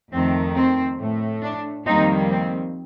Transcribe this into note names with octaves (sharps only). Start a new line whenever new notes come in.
F2 D#3 A3 C4
C4
A2 A3
D4
F2 D#3 G3 A#3 C4 D#4
C4